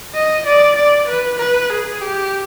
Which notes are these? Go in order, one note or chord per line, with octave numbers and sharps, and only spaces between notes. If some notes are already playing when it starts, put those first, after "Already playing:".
D#5
D5
D5
B4
B4
G#4
G4